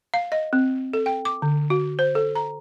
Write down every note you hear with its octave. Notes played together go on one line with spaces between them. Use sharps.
F5
D#5
C4
A4
G5
D6
D3
F#4
C5
A4
A#5